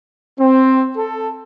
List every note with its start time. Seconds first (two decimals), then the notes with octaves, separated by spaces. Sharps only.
0.40 C4
0.97 A4